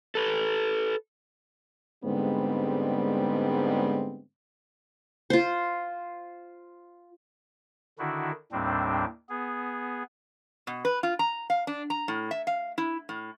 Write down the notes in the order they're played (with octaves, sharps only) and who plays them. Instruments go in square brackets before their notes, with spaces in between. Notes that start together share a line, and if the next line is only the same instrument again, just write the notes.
[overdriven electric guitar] A4 B4
[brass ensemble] G#2 D3 G3 G#3 B3 C4
[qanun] F4 C5
[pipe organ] D3 D#3 D4 E4 F#4
D#2 A2 G3 C4 D4
B3 G#4
[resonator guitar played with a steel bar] B2
B4
F4
A#5
F5
D4
A#5
A2
E5
F5
E4
A2